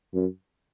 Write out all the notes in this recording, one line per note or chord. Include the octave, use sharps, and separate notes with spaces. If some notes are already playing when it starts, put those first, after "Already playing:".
F#2